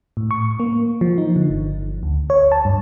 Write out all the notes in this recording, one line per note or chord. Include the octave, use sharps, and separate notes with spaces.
A2
C#6
A#3
F3
D#4
D3
G1
D2
C#5
A5
G2